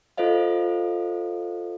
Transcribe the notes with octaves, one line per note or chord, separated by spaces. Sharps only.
F4 A4 C5 D#5 F5